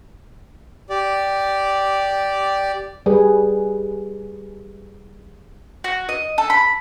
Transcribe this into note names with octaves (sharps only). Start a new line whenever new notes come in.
G4 D5
G3 G#4 B4
F#4
D#5
A4
B5